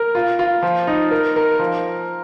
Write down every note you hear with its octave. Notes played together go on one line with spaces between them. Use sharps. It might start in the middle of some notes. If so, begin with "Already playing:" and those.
Already playing: A#4
F4
F4
F3
D#4
A#4
A#4
F3